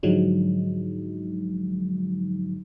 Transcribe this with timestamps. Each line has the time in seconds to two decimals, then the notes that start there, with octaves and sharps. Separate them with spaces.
0.03 G#2 D3 F3 F#3 G#3 D#4